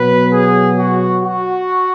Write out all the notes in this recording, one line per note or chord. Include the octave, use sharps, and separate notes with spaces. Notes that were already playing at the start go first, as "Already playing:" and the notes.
Already playing: B2 F#3 B3 B4
G#4
F#4
F#4